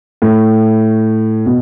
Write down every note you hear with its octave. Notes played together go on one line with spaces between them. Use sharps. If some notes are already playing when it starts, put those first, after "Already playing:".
A2
B2